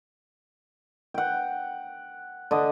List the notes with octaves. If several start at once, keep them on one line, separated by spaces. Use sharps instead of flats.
F#5 G5
D3 D4 D#5